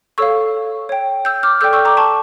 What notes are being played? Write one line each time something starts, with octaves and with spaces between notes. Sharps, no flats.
A4 C#5 F5 C#6 E6
C#5 G5
E6 G6
D6 F6
A4 D5 G5 E6 G6
C#6 E6
A#5 D6
A5 C#6